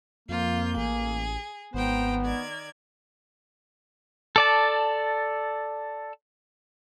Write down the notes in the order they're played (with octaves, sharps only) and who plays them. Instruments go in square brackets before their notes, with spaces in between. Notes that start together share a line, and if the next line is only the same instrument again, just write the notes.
[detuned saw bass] F2 [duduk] A#3 [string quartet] F4 G6
[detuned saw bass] A1 [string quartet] G#4
[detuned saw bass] G#1 [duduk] B3 [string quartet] C5 G5 A#5
[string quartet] D#3 D5 G#6
[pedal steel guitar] A4 D5 A5